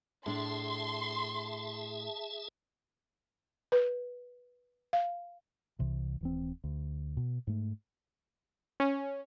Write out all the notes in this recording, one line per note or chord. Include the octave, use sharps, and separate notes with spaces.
A2 D4 G#4 E5 A5 C6
B4
F5
C2 C3 E3
D#1 E3 C4
D2
B2
G#2 A3
C#4